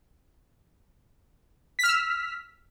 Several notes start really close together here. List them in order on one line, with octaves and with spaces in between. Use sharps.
B6 F6 E6